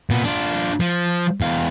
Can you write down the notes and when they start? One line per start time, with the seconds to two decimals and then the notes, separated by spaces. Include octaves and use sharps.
0.10 A#2 B3
0.25 D4 F4
0.80 F3
1.41 E2 F5